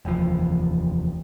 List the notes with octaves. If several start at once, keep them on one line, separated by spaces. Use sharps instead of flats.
F1 D#2 E3 F3